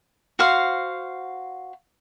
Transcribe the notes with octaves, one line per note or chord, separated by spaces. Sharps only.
F#4 C5 F5